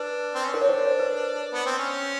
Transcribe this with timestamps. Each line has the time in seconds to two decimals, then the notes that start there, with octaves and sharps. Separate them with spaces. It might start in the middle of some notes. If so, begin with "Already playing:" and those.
Already playing: D4 B4
0.35 C4
0.43 C#4
0.53 D4 A#4
0.62 C#5
0.69 C5
0.85 C#5
0.99 B4
1.54 B3
1.66 C4
1.78 C#4